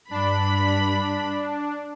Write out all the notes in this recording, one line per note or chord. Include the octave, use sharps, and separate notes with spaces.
G2 D4 B5